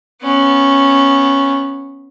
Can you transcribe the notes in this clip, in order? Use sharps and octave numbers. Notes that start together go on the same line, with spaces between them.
B3 C#4